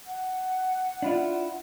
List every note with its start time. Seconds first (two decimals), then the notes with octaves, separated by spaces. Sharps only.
0.06 F#5
1.02 D4 E4 F4